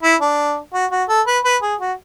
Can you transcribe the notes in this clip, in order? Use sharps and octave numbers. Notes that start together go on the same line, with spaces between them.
E4
D4
F#4
F#4
A4
B4
B4
G#4
F#4